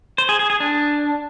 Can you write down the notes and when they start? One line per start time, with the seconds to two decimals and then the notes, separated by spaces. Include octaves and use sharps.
0.18 C5
0.29 G#4
0.39 G#4
0.50 G#4
0.60 D4